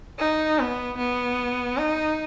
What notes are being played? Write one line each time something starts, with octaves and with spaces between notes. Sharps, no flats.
D#4
B3
B3
D#4